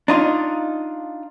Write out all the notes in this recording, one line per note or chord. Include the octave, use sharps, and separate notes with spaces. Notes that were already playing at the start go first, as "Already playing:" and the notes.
D4 D#4 F4